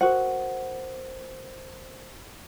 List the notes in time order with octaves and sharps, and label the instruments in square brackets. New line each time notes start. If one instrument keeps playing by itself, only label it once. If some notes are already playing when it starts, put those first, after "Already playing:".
[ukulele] F#4 F#5 [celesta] A#4 C5